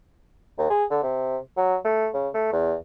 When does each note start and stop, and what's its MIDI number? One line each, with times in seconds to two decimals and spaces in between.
0.58 0.66 39
0.70 0.84 68
0.91 0.98 50
1.03 1.37 48
1.57 1.77 54
1.85 2.08 57
2.14 2.29 49
2.34 2.51 57
2.53 2.75 40